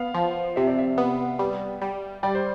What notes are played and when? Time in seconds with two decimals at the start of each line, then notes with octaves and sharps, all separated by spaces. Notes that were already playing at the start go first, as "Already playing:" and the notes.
Already playing: B3 F5
0.14 F3
0.56 C3 E5
0.67 D5
0.78 E5
0.98 B3
1.39 G3
1.82 G3
2.23 G3 D5
2.35 C5